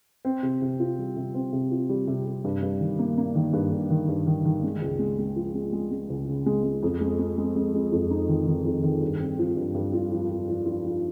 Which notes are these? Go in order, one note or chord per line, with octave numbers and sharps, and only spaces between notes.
C4
C3
C3
F4
G3
C3
C4
C3
F4
G3
C3
C3
G2
G2
D#3
A#3
A#3
D#3
G2
G2
D#3
G2
D#3
D#3
G#3
C#2
G#3
G#3
F3
G#3
G#3
G#3
C#2
C#3
G#3
G#3
F2
G#3
G#3
G#3
G#3
G#3
F2
D#4
D#3
D#3
F2
D#3
G2
C4
F3
G2
G2
F4
F3
F3
F3
F4
F3